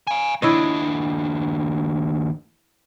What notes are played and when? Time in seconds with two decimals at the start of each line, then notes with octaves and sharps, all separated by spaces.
0.07 F5 G#5
0.42 D#2 D4 E4 C#5 D#5